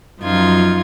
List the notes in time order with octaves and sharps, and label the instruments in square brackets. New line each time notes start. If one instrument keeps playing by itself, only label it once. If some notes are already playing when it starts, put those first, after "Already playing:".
[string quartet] F#2 F3 D#4 F4 G#6